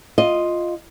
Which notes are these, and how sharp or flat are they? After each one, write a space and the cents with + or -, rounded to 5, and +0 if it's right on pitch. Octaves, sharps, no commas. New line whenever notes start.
F4 +0 D#5 +0